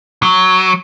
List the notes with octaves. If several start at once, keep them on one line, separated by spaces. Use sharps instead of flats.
F#3